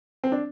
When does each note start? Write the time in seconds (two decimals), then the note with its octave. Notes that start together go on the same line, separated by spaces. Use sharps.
0.24 C4
0.32 D4